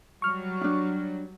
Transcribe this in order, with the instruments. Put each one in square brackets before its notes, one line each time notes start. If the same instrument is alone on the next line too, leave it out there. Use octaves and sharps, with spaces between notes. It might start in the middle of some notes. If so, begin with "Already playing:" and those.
[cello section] F#3 G3 [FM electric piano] C#6 F6
[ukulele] D4 D#4